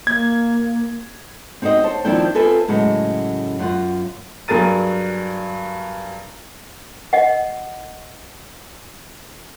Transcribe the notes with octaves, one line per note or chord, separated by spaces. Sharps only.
A#3 G#6
C4 D#4 F#4 C5 D#5
C5 C#5 A5
D#3 F3 C4 D4 E4 G5
C4 F4 A4 B4 E5 G#5
A2 C#3 F#3 G#3
F#2 F4 F#5
G2 F#3 G#4 A#4 A6 D#7
D#5 F#5